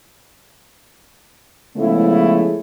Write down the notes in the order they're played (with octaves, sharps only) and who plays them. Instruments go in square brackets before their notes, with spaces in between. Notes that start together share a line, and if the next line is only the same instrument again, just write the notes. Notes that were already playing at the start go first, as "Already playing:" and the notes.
[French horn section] C#3 F3 G#3 A3 B3 E4